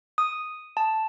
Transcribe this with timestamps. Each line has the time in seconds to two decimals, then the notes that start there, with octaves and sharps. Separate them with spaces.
0.18 D#6
0.77 A5